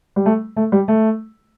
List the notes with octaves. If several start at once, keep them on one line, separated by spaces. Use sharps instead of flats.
G3
A3
A3
G3
A3